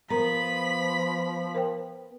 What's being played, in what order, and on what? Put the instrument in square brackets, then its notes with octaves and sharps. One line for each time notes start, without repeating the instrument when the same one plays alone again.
[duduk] F3 [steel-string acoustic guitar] B3 [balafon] A#4 A#5 [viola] B5
[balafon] A#4 C5 G5